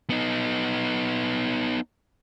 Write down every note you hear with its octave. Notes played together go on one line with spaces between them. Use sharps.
B3 D#4